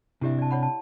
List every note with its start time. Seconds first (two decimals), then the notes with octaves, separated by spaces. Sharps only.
0.21 C3 D4 E4 G4 E5
0.39 D5 A5
0.51 C#5 F#5 B5
0.63 A5